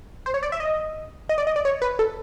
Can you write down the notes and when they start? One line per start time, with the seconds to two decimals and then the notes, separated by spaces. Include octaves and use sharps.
0.26 C5
0.34 C#5
0.43 D5
0.52 E5
0.60 D#5
1.29 D#5
1.38 D5
1.47 D#5
1.56 D5
1.65 C#5
1.82 B4
1.99 A4